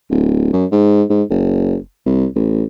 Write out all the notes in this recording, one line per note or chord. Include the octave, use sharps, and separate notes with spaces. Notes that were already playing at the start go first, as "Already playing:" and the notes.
D1
F#2
G#2
G#2
F#1
C2
A1